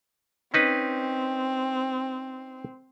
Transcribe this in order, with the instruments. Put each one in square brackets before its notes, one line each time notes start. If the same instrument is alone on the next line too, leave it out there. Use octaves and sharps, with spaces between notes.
[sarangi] C4 [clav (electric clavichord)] C#4 D#4 B4